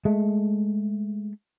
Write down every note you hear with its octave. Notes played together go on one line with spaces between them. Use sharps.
G#3 A3